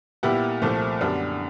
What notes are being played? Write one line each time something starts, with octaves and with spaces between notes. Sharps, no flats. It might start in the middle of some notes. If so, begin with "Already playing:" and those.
A#2 G3 B3 E4 G4
C2 A#2 F3 A3
F#2 D3 G3 B3 D4